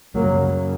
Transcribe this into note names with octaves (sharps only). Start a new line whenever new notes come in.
F#2 C#3 F#3 A#3